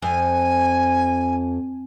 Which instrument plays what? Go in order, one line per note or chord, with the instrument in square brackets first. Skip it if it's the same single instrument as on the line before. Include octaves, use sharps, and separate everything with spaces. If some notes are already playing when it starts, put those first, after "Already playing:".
[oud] F2 [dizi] G#5